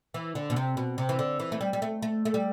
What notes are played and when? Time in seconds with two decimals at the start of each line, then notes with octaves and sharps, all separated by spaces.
0.14 E3
0.35 D3
0.50 B2
0.56 C3
0.77 B2
0.98 C3
1.09 E3
1.19 D3
1.40 E3
1.52 A3
1.61 G3
1.73 G3
1.82 A3
2.02 A3
2.25 A3
2.34 G3